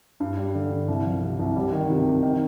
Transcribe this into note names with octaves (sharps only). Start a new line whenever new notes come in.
G2
G3
D3
G2
C2
F3
C3
C2
G3
D#3
C3
C3
D#3